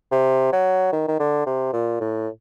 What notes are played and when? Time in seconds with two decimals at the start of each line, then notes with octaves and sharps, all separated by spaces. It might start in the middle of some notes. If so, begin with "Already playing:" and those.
0.12 C3
0.53 F#3
0.93 D#3
1.08 D#3
1.20 D3
1.46 C3
1.73 A#2
2.00 A2